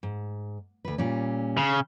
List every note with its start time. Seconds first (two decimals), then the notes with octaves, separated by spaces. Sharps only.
0.03 G#2
0.85 D2 B4
0.98 A#2 G3 C#4
1.57 C#3